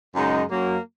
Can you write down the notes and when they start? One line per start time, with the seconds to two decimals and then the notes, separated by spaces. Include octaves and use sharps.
0.15 F#2 C#3 G#3 D#4
0.50 F#2 F#3 A#3